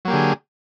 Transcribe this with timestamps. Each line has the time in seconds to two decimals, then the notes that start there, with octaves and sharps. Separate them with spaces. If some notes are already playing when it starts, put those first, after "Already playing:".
0.05 F#3
0.08 A#3
0.10 G4
0.13 D3
0.16 G#4